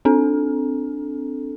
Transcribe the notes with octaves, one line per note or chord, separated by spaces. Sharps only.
C4 D4 A4